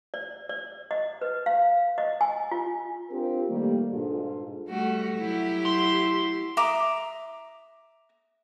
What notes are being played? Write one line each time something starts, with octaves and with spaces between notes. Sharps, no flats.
D5
D5
D#5
B4
F5
D#5
G#5
F4
C4 D4 F4 G4 A#4
D#3 G3 A3 A#3
G#2 B2 D4 F4 G#4 A4
G3 A3 F#4
F#3 E4 G4
C6
E5 A#5 D6 D#6